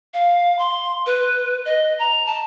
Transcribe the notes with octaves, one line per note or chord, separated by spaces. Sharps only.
F5
C6
B4
D#5
A#5
A5